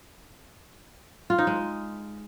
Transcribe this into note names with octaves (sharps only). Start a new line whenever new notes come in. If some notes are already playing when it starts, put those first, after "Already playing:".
F4
D#4
G#3